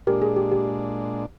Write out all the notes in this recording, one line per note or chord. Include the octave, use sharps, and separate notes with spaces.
A#2 G#3 D4 G4 A#4
G#4
G4
G4